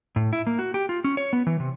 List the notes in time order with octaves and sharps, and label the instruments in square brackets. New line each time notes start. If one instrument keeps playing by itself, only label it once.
[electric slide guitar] A2
E4
A#3
F#4
G4
F4
C#4
C#5
B3
E3
C3